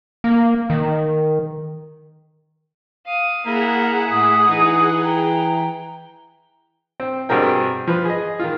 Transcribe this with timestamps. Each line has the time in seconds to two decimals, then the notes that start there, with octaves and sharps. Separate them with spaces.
0.24 A#3
0.70 D#3
3.06 F5 D#6
3.46 A#3 E4 G#4 F#5 A#5
4.11 A2 D#6
4.48 E3 D#4
5.03 G5 A#5
7.00 C4
7.29 G2 B2 C4 G#4 A#4 G5
7.87 F3 B4
8.05 G#4 D#5
8.40 D#3 F4